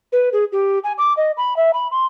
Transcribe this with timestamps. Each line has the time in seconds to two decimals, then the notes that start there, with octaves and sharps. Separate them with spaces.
0.13 B4
0.33 G#4
0.52 G4
0.84 G#5
0.98 D6
1.17 D#5
1.37 B5
1.57 E5
1.74 B5
1.91 C6